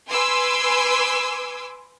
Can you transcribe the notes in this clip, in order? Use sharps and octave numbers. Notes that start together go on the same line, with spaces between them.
B4 G#5 C6 D6 E6